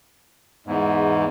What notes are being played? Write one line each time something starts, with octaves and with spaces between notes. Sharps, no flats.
E2 G#2